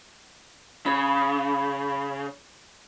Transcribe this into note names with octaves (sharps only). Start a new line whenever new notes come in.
C#3 B5